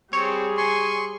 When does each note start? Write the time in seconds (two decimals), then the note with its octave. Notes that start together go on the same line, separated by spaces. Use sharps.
0.13 G3 C4 G#4 C#5
0.57 G#5 C6 C#6